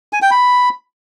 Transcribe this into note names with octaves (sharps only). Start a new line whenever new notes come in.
G#5
G5
B5